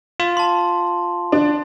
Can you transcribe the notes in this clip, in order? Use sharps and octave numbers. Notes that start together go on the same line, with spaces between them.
F4
A5 C6
D4